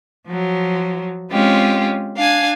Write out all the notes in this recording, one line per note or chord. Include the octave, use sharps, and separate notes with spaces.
F3 F#3
G#3 C4 C#4 F4 G4
D4 F5 G#5